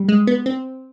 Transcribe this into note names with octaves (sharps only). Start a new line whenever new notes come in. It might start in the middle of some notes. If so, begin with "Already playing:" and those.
Already playing: G3
G#3
B3
C4